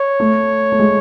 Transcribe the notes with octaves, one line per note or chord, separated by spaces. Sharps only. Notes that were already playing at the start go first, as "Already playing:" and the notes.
Already playing: C#5
A3
A3
G#3